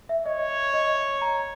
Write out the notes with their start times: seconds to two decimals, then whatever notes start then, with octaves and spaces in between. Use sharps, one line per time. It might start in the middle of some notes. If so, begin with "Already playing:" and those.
0.09 E5
0.26 C#5 D#5
0.73 D#5
1.22 A#5